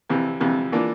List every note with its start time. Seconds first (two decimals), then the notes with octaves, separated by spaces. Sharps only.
0.09 F2 C3 E3
0.40 F2 C3 E3
0.72 E3 A#3 D4 F4